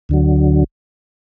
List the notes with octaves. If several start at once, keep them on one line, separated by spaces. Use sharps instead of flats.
D2 D3 F#3